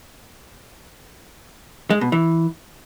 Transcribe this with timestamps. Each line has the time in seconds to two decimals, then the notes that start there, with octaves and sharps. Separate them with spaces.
1.90 G#3
2.01 B2
2.12 E3